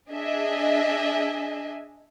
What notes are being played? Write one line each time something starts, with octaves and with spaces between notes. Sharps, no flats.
D4 G#4 D#5 E5 G#5